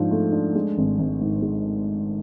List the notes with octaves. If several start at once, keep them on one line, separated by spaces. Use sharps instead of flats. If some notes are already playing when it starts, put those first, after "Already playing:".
Already playing: G#2 F3 D4
A3
D4
G#3
G#1
G#1
G#2
G#3